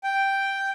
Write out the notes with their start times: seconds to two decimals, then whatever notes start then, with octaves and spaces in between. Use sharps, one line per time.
0.04 G5